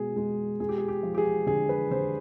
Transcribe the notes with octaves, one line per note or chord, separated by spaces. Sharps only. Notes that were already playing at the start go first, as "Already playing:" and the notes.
Already playing: B2 G#3 G#4
G#3
G#3 G#4
G4
G#4
G4
F3
G4
G#4
D3 G#4
B4
D3 C5